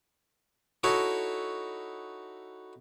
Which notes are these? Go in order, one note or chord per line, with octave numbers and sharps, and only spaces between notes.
D#4 E4 F#4 A4 C#5 D#5